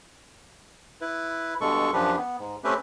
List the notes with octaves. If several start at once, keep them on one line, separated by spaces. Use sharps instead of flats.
E4 B4
G2 B2 G#3 A4 C#6
F#2 F3 D4 G4 B4
B3
G#2
A3 C4 C#4 G4 B4 E5